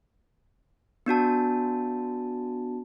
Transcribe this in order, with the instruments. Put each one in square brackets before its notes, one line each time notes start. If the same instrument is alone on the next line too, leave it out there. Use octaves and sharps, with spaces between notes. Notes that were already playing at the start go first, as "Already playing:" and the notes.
[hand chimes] B3 D4 F#4 A5